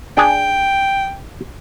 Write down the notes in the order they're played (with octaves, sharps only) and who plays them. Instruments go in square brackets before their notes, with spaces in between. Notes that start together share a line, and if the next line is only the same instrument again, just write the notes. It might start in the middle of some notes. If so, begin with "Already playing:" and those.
[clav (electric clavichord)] D4 G#4 [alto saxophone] G5